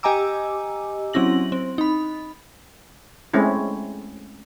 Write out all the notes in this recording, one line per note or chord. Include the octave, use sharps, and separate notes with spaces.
G4 D#5 G#5 A#5 D6 E6
F#3 C4 C#4 E4 A#6 F#7
C4
D#4 B5
G#3 A3 C4 C#4 E4